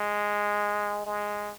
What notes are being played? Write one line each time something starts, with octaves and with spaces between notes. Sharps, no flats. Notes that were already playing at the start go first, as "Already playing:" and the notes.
Already playing: G#3
G#3